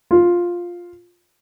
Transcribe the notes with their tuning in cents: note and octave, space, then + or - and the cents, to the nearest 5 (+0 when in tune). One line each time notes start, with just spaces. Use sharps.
F4 +5